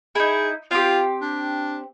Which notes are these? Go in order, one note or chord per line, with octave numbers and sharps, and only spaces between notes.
D#4 E4 G#4
C4 F4 G4
D4